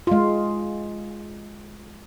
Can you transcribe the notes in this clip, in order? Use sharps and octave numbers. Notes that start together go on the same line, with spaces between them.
G#3 F4